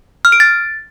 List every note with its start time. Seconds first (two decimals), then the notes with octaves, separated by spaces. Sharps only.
0.25 F6
0.32 D7
0.40 A6